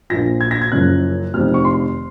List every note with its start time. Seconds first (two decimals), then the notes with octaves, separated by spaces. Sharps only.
0.10 A#1 A#2 F3 A#6
0.41 G#6
0.51 A#6
0.62 G#6
0.72 F#1 F#2 C#3 F3 F#6
1.34 F1 F2 D#3 F6
1.54 C#6
1.65 C6